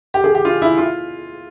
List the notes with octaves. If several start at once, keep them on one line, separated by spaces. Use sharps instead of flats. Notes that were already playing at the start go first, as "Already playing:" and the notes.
G4
G#4
G4
F4
E4
F4